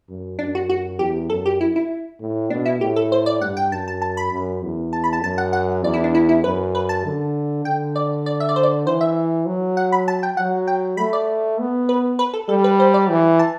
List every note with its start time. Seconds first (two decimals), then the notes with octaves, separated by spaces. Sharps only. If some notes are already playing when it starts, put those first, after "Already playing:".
0.09 F#2
0.39 F#2 D4
0.55 F#4
0.69 F#4
0.99 E2 G4
1.30 F#2 A4
1.46 G4
1.61 E4
1.76 E4
2.20 A2
2.50 B2 D4
2.66 E4
2.81 A2 G4
2.96 A4
3.12 C5
3.26 D5
3.41 G2 F#5
3.57 G5
3.72 F#2 A5
3.88 A5
4.02 A5
4.17 B5
4.32 F#2
4.63 E2
4.93 A5
5.04 B5
5.13 A5
5.23 F#2 A5
5.38 F#5
5.53 F#5
5.84 E2 D5
5.94 E4
6.04 D4
6.15 E4
6.29 E4
6.44 F#2 B4
6.75 B4
6.89 A5
7.05 D3
7.65 D3 G5
7.96 D5
8.26 D5
8.40 E5
8.49 D5
8.56 C5
8.63 D5
8.86 E3 C5
9.01 E5
9.46 F#3
9.77 F#5
9.92 B5
10.08 A5
10.23 G5
10.37 F#3 F#5
10.68 G5
10.97 A3 B5
11.13 D5
11.59 B3
11.89 B4
12.19 B4
12.33 A4
12.49 G3 A4
12.64 B4
12.80 C5
12.94 D5
13.10 E3
13.39 A5